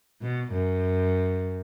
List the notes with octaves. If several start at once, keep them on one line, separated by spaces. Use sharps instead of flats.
B2
F#2